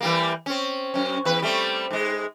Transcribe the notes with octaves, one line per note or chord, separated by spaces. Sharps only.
E3 G3 A#3
C4 C#4
F#2 C#4
E2 B4
G3 A3 C4
G#2 G#3